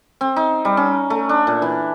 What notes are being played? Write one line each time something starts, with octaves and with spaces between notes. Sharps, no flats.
C4
D#4
G3
C#4
A3
D4
A#2
E3